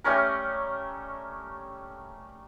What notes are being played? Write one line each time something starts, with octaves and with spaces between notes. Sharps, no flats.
G3 A3 C#4 A#4